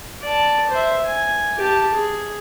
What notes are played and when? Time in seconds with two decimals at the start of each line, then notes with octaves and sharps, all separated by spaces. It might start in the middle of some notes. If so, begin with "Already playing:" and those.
0.22 D5 A5
0.70 C5 E5
1.05 G#5
1.58 G4 A5
1.94 G#4